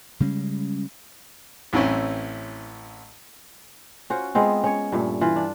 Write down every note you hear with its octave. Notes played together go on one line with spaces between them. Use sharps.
C#3 G3 G#3 C#4
A1 E3 C4 C#4 E4
C#4 F4 F#4 C5
G#3 B3 C4 F4
C#4 C#5
G2 A#2 A3
E3 F4
D4